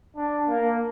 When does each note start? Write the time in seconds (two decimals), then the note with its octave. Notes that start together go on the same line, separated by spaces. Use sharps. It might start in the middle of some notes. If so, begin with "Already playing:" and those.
0.16 D4
0.48 A#3